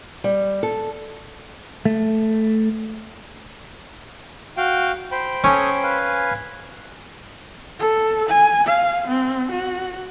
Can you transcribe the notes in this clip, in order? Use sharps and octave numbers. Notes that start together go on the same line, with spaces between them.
G3
A4
A3
F#4 F5 G5
C5 G5 B5
C#4 A4 C#5 D#6
B4 F5 G#5
A4
G#5
F5
C4
F#4